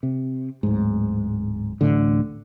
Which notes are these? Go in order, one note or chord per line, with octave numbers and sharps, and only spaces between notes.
C3
D1 G#2
D1 A1 A2 D3